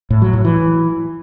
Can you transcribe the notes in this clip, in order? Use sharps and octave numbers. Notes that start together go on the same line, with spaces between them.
A2
F#3
A2
E3